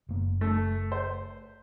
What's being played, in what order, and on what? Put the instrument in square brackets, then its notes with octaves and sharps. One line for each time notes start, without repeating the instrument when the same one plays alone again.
[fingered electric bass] F#1 A#3
[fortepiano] A3
C5